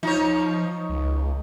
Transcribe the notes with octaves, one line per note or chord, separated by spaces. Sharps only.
F3 D#4 C#5
C#2